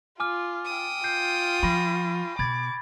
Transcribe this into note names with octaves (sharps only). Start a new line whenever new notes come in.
F4 G#5 D6 F6
G5 D#6
F4 G6 C7
F3 B5 C#6 A#6
B2 B5 D6 G#6 A6